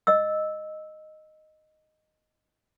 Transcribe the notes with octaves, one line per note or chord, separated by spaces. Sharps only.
D#5 E6